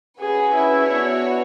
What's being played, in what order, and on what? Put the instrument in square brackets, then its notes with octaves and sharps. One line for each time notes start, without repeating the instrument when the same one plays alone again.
[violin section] C#4 F#4 B4 [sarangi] G#4
[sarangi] E4
[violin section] B3 D4 F#4 C#5